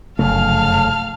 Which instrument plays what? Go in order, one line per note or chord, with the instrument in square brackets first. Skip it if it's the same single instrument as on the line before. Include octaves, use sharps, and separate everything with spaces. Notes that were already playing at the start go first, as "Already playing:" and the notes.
[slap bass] F1 A3 [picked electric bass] F#2 C#3 F#3 [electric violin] F5 F6 [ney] A5